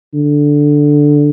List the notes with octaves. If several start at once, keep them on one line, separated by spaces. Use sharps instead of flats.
D3